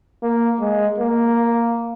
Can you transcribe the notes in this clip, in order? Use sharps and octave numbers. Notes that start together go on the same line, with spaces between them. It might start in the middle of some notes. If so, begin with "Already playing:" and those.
A#3
G#3
A#3